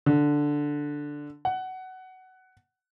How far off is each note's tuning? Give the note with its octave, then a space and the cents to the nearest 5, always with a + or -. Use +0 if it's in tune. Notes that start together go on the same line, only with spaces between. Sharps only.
D3 +0
F#5 +15